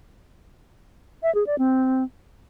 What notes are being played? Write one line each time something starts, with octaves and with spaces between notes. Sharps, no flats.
E5
G#4
D5
C4